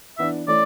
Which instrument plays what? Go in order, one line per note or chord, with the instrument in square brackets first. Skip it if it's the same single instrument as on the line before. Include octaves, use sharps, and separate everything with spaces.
[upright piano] E3 B3 D4 [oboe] E5
[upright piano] E3 A3 C#4 E4 [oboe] D5